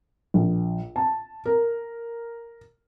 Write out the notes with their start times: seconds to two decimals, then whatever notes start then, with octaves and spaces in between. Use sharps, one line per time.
0.34 A#1
0.96 A5
1.45 A#4